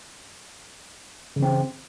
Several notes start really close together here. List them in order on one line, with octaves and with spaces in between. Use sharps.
C#3 E3 C4